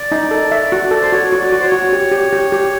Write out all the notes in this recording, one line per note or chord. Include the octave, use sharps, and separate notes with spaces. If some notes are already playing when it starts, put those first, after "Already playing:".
Already playing: D5
D#4
A4
E5
F#4
A4
C5
F#4 C#5
F#4
D5
F#4
C5
C#5
F#4
G4
G4
G4
G4